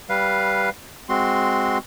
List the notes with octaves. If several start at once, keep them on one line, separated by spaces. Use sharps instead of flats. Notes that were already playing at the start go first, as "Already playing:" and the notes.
G3 B4 F5
G#3 C4 F#4 C6